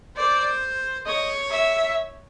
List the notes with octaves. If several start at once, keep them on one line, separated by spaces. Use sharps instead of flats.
C5 D5
C#5 D#5
E5